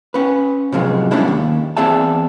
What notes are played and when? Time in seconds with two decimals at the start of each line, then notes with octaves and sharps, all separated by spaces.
0.14 C#4 B4
0.72 A2 C3 F3 F#3 G#3
1.11 G3 A3 B3 C#4 D4 E4
1.28 D#2
1.77 E2 C4 G#4 D5 E5 A5